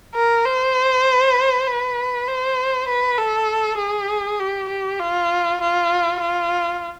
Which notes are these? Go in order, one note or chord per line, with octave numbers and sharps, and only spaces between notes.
A#4
C5
B4
C5
B4
A4
G#4
G4
G4
F4
F4
F4